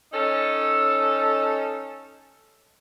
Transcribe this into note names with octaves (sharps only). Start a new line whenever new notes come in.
C#4 D#4 A4